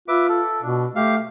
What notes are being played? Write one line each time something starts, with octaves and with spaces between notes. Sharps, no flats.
F4 B4 E5 D6
A4
B2 D4
A3 G4 F5